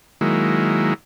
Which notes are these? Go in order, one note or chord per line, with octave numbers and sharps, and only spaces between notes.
D#3 F#3 G#3 A#3 E4